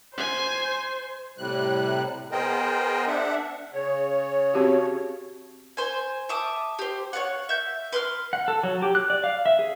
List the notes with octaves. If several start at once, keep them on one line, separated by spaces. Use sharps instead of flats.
C5 G#5
A2 C3 G3 F#6
B3 G#4 A#4 C5 D#5 G5
D4 E5 F#5
C#3 C#5
C4 F#4 G4
C5 G#5
E5 A5 D6 D#6
G4 C5
C#5 D5 F5 F#5
E5 G6
B4 C6 D6 F6
F#5
A4
F#3
G4
F#6
D5
F5
E5
G#4